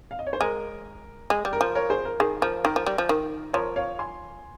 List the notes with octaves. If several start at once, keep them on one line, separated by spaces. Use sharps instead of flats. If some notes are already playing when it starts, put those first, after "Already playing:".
F5
D#5
C#5
C5
G#3 A#4
G#3
G3
A#4
F3
A#4 C#5
G#4 C5
A#4
D#3 G#4
F3 A#4
D#3 A#4
F3
G3
F3
D#3
F3 A#4 C#5
C#5 F5
G#5 C6